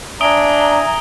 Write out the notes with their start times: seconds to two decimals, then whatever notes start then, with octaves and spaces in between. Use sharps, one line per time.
0.21 D4 E5 G#5 A#5 D#6 D7 G7